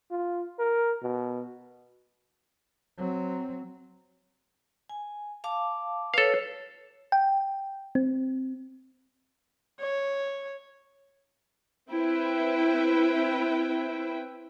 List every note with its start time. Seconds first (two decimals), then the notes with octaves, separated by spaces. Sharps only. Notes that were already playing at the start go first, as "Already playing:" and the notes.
0.11 F4
0.59 A#4
1.03 B2
2.98 F#3 C4
4.89 G#5
5.44 F5 A5 D6
6.14 A4 B4 C#5 F5
7.12 G5
7.95 C4
9.80 C#5
11.90 C4 E4 B4 E5 G5